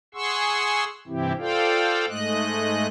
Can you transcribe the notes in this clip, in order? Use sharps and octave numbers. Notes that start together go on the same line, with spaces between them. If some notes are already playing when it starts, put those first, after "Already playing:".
G#4 F#5 C6 C#6 E6
G2 C3 E3 C4 E4 G4
F4 A4 C5 D5 F5 G5
G#2 G#3 A3 D#5 F#6